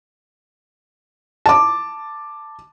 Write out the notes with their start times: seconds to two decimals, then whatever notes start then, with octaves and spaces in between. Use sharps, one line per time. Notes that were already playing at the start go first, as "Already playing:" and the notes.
1.46 A5 D6